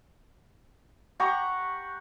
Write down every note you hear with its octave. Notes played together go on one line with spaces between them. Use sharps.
G4 F#5 A#5 C#6